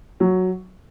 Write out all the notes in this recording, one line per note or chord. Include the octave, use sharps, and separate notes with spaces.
F#3